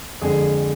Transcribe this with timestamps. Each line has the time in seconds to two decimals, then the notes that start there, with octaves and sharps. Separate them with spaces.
0.22 F2 D3 G#3 G#4